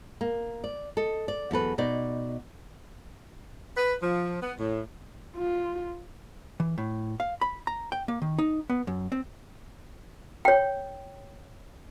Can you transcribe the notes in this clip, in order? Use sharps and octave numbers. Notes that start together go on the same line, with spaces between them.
A#3
D5
A4 D#5
D5
E2 F#3 A4 B4
B2 D#4 D5
B4
F3
B3
A2
F4
E3
A2
F5
B5
A#5
G5
A#3
D#3
D#4
B3
F#2
C4
C#5 G5